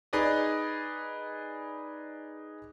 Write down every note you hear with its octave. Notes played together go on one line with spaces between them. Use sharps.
D#4 G#4 B4 D5 D#5